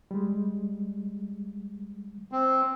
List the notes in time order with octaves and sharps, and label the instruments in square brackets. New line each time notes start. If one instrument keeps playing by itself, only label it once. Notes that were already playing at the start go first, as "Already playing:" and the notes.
[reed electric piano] G3 G#3
[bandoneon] C4